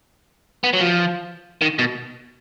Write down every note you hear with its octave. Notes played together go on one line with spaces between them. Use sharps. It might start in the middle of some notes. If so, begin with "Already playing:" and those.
B3
F#3
F3
D#3
B2